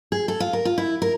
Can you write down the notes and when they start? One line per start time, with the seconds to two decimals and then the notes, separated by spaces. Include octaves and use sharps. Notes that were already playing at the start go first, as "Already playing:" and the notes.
0.12 G#4
0.28 A4
0.40 F4
0.53 A#4
0.65 F4
0.78 E4
1.02 A#4